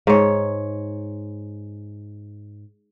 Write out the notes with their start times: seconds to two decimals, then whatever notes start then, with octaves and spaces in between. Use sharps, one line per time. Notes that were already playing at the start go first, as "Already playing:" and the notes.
0.07 G#2 C#5